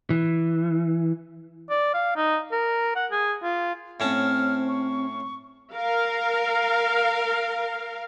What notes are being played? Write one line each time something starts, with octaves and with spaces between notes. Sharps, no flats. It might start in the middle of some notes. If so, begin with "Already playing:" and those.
E3
D5
F5
D#4
A#4
F#5
G#4
F4
A2 C4 C#4 A5 F6
C#6
A#4 F5